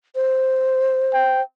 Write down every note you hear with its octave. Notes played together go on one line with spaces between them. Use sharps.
C5
G5